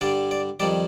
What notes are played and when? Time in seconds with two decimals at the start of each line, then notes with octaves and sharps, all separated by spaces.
0.01 G2 D3 G3 D5
0.31 D5
0.60 F2 D#3 G3 D5